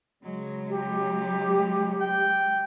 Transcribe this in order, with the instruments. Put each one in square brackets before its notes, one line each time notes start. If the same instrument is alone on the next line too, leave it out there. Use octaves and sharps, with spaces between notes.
[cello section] C#3 F#3 G#3
[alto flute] G4
[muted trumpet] G5